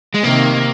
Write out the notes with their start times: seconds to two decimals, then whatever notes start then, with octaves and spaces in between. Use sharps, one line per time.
0.14 G#3
0.23 C3 D#3 A#3